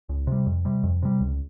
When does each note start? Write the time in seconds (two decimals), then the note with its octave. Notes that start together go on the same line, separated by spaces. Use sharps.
0.09 C#2
0.27 C3 G3
0.47 F2
0.65 C3 G3
0.83 F2
1.02 C3 G3
1.21 C#2